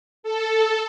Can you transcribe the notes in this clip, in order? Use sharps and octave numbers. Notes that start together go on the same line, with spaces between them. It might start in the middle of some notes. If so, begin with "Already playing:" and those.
A4